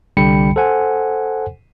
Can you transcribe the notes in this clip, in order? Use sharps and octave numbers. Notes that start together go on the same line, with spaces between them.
C2 D3 G3 G5 B5 C#7
A4 C5 F#5 G#5